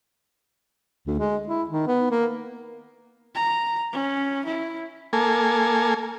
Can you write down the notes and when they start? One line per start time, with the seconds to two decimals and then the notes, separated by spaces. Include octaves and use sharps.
1.07 D2
1.19 G#3
1.48 E4
1.70 D#3
1.87 B3
2.11 A#3
3.34 A#5
3.92 C#4
4.45 E4
5.13 A#3 A4 G#5